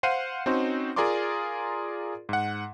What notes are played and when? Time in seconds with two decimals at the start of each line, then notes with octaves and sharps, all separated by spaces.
0.03 C5 F5 F#5 C7 D#7
0.46 C4 C#4 D#4 F#4 C5
0.96 F4 G#4 A#4 D5 C6 D6
2.29 G#2 F#5